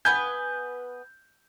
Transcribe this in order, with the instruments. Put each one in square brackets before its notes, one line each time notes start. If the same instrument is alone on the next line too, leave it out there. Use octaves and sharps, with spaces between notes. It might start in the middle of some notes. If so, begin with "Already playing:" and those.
[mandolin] B3 B4 G#5 [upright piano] G6